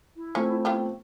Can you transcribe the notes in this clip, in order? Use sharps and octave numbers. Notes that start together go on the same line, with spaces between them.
E4
F3 A3 C4 C#4
B3 F4 G4